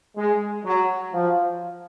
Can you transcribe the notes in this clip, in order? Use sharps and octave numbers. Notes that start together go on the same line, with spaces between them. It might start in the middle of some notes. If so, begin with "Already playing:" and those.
G#3
F#3
F3